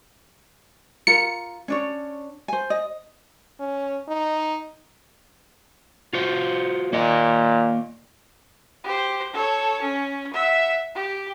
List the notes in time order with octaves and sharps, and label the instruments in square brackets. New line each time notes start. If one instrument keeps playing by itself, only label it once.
[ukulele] F4 A#4 [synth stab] C#7
[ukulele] C#4 D4 C#5
C5 G#5
D#5
[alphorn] C#4
D#4
[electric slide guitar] F4 F#4 C5
[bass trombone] A#2 [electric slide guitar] A#3 D#5
[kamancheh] G4 C5
A4 C#5
C#4
E5 F#5
G4